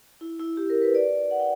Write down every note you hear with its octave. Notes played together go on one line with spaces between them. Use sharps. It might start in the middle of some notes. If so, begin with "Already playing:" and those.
E4
E4
G4
A#4
B4
D5
F#5
G5